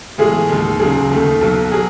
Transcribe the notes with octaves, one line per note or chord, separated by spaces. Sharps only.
B1 A2 E3 G#3 G#4
D#2 D#3 G#3
C#2 C#3 F#3 G#4
D#2 D#3 A3
B1 B2 F#3 A4
F#3 G#4